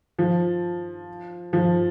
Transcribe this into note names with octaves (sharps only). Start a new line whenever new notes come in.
F3
F3